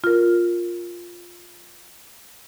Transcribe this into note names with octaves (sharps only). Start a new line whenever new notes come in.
F4 A#4